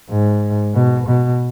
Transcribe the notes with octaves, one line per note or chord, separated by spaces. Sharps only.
G#2
B2
B2